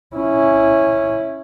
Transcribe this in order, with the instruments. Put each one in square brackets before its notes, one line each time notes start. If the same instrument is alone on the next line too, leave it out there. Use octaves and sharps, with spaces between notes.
[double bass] C#4 E4